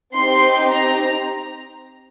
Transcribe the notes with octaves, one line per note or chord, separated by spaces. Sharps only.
C4 D#4 G4 C6
A#5